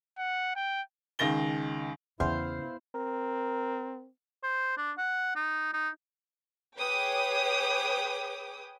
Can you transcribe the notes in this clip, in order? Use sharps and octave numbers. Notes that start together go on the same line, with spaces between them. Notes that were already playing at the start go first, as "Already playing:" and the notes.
F#5
G5
C#2 D#3 A#6 G7
E2 C#3 B3 C#4 E4 C5 F5
C4 A#4
C5
D4
F#5
D#4
D#4
G#4 B4 C#5 G5 D6 D#6